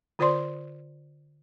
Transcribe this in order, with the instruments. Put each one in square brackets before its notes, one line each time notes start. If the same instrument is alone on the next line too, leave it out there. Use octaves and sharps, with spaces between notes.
[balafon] D3 F4 C5 D5 C6